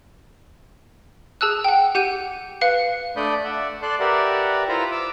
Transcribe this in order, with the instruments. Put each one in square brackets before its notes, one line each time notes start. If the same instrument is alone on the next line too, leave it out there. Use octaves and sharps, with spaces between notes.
[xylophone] G#4 A5 E6 F#6
F#5 G5
G4 F#5 G6 D#7
B4 F5 F#6 C#7
[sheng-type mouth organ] A3 D4 D5 B5 D#6 G6
D5 E5 F#5
A4 D5 C6 F#6
G4 A#4 B4 D5 E5 F#5
E4 F4 B4 C5 A#5 B5
D6 E6